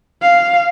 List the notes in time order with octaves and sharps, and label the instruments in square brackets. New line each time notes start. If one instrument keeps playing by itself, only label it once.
[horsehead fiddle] F5